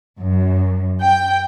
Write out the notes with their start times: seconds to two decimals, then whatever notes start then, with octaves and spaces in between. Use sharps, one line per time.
0.19 F#2
1.00 G5